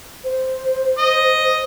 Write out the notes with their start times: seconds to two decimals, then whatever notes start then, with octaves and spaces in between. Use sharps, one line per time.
0.24 C5
0.98 D#5